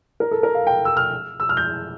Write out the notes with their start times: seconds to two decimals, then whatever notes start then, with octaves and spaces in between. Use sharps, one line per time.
0.20 A#4
0.31 A4
0.43 A#4
0.54 F5
0.67 G5
0.85 E6
0.97 F6
1.40 E6
1.49 F6
1.57 G6